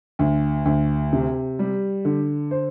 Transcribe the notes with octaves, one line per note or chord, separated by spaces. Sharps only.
D2
D2
C3
G3
D3
C5